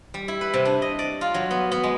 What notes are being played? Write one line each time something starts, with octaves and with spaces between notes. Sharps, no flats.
G3
E4
B4
C3
D4
D#5
D5
F4
F#3
B3
B3
G#3